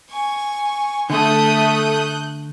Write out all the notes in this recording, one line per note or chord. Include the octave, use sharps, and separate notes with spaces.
G#5 C#6
D3 A3 D#6 F#6 G6